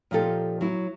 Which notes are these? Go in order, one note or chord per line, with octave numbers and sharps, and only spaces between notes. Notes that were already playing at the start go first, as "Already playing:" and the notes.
A#2 F3 D#4 G4 A4
F#3 E4